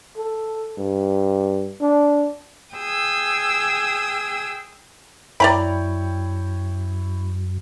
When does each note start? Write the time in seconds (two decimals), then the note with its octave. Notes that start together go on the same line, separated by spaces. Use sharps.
0.17 A4
0.78 G2
1.81 D4
2.75 G#4 G5 D#6 E6
5.40 F#2 E4 C#5 D5 G5 A#5 B5